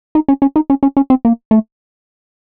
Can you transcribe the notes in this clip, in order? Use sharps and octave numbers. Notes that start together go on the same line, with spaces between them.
D#4
C#4
C#4
D#4
C#4
C#4
C#4
C4
A#3
A3